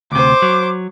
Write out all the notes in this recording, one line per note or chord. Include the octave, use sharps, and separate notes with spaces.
D2 C3 C5 D6
F#3